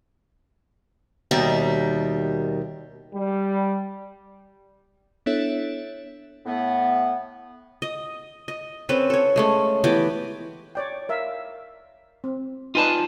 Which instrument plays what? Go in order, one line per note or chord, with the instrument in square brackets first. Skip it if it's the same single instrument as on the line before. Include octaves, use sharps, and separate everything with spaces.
[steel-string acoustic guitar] D#2 B2 D#3 G3 E5
[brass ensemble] G3
[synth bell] B3 D4 E4 A4 C#5 E5
[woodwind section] A2 B3
[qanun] D#5
D#5
C4 C#4 A4 B4
A4 C#5
G#3 A3 C#4
E3 B3 G4 D6
[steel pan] C#5 D5 G5
A#4 E5 F5
C4
[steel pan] D#4 B4 D5 [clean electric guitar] F4 G#5 A5